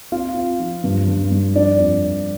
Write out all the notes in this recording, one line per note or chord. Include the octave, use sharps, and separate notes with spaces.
C4 F4 F5
C4
F3
G2
G2
G3
F3 D4 D5
F2
F2